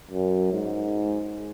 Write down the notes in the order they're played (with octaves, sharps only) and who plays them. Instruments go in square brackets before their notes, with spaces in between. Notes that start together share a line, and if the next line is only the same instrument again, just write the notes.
[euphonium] F#2
G#2